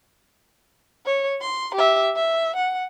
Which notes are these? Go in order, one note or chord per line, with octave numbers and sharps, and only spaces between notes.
C#5
C6
G4 E5
E5
F#5